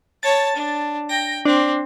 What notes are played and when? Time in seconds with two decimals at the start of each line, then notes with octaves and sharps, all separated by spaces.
0.23 C#5 A5 A6
0.56 D4
1.09 G5 A#6
1.45 C4 D4